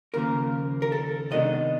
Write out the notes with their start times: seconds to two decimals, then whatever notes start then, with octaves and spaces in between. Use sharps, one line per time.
0.14 D#2 C#3 F3 A#3 A#4
0.82 A#4
0.92 A4
1.31 C3 D#3 G#3 B3 D4 D#5